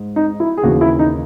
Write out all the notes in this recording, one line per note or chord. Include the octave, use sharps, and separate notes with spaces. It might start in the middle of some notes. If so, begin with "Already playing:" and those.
Already playing: G#2 G#3
D#4
E4
G#4
D#2 C#3 E3 F#4
E4
D#4